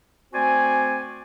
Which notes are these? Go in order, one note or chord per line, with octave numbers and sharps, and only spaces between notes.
A3 C4 F#4 C5 D5 G#5